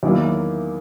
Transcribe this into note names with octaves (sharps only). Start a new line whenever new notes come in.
E2 D#3 F#3 A#3 E4